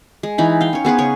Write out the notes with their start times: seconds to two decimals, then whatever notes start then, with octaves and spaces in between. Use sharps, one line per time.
0.23 G#3
0.38 E3 D#4 B5
0.61 F5 G5
0.73 C#4 C#5
0.85 B3 G#4 B4 C5
0.98 C#3 C#5 C#6